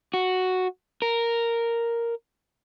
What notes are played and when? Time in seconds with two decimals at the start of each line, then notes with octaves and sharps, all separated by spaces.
0.14 F#4
1.02 A#4